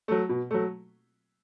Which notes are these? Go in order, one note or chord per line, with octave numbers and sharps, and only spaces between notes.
F#3 A3
B2
F#3 A3